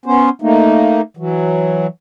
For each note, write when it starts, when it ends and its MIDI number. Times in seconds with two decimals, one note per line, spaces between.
0.06 0.30 59
0.06 0.30 61
0.06 0.30 72
0.42 1.01 57
0.42 1.01 58
0.42 1.01 63
1.17 1.87 52
1.17 1.87 54